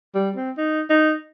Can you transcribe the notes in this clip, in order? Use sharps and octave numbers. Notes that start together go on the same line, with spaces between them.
G3
C4
D#4
D#4